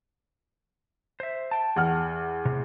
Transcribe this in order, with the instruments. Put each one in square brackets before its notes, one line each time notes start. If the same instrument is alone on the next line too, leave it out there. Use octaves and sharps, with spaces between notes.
[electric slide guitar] C5 E5
G5 A5
[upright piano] E2 F#5 F6
[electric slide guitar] A2 C3